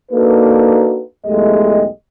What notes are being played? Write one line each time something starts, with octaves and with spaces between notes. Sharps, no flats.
A#3 D4 D#4 F#4 A4 B4
B1 E2 G#3 A3 G4 D#5